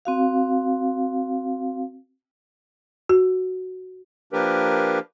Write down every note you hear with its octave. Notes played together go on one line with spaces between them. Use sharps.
C4 F#4 F5
F#4
F3 A#3 D4 G4 A#4 B4